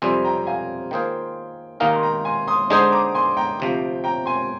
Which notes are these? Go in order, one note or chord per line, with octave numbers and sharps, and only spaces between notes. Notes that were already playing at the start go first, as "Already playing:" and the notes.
F2 C3 G3 G#5 C6
G5 A#5
F5 G#5
D#3 A#3 F4 G#4 C5 G5
D#2 D#3 A#3 D#4 A#4 F5 G#5
C6
G5 A#5
G#5 C6
C6 D#6
D3 G#3 D#4 G#4 C5 C6 D#6
A#5 D6
G#5 C6
G5 A#5
D2 C3 F3
G5 A#5
G#5 C6